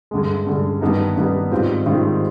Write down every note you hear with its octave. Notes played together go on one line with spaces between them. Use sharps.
G2 D3 G#3
G2 D3 G#3
G2 D#3 G3 B3 D#4
G2 D#3 G3 B3 D#4
G#2 D#3 G3 C4 F4
G#2 D#3 G3 C4 F4